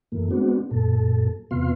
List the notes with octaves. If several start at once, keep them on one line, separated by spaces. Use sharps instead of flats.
F#2 E3 A3 A#3
G#3 B3 C4 D4 F#4
F#2 A#2 A4
E2 C3 B3 F4 F5 C6